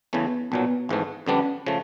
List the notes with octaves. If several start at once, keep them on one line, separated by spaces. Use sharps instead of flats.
E2 C#3 E3 A3 B3
B1 A#2 F#3 B3
G#1 G#2 E3 A3
F2 D3 G3 B3 C#4 D4
C#3 F3 A3